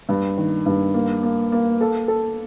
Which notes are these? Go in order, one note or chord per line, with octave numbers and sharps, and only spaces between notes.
G2
D#3
G2
A#3
A#3
A#3
A4
A4